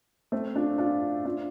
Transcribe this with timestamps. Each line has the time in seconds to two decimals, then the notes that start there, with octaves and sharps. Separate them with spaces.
0.32 A3 C4
0.55 D4 F4
0.78 D4 F4
1.25 D4 F4